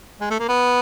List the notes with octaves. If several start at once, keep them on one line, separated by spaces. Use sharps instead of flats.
G#3
A3
A#3
B3